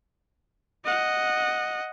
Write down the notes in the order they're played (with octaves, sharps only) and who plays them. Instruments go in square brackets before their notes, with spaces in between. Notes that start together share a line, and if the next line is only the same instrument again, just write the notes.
[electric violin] D#5 F#5